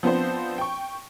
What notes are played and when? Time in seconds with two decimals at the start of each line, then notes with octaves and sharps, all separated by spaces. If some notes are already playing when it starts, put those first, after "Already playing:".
0.03 F3 B3 C4 D4 C5
0.58 G5 C#6